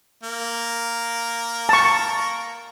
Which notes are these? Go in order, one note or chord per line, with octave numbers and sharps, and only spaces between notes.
A#3
A5 C#6